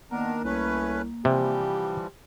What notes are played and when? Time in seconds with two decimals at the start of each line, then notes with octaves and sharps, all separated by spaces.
0.11 D#3 A#3 B3 D4 A#4
0.44 C2 A3 C#4 B4
1.25 C3 E3 F3 G3 G4